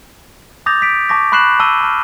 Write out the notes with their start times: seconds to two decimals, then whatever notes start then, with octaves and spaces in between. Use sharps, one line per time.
0.66 D6 D#6 G6 A6 A#6 F7
0.81 A#6 B6 D7
1.09 A5 C#6 D6 A#6
1.32 B5 C#6 F#6 C7 E7 F#7
1.60 A5 E6 F#6 D#7 G7
1.81 A5 F6